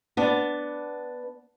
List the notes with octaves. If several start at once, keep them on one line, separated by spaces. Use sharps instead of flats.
B3 D4